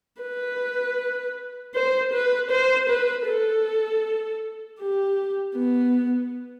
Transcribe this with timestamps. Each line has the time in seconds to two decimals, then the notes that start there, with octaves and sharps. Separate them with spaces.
0.22 B4
1.75 C5
2.13 B4
2.51 C5
2.89 B4
3.27 A4
4.80 G4
5.56 B3